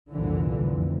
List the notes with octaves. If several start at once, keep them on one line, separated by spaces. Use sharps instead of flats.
C2 F2 A#2 D3 E3
F1